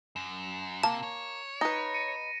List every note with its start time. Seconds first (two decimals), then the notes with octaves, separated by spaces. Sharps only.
0.16 F#2 E7
0.83 C3 A#3 A5
1.03 C#5
1.61 D#4 B4 A#6
1.94 C#7 D#7